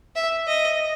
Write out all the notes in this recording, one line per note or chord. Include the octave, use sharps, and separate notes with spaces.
E5
D#5